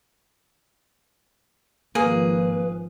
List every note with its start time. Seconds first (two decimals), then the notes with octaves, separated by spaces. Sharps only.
1.95 G#1 F3 A#3 G#4 B4